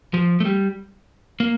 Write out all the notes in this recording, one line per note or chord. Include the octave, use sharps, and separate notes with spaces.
F3
A3
G3
A#3